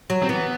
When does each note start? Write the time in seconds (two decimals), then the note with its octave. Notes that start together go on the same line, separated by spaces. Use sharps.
0.10 F#3
0.23 C4
0.29 E3 B3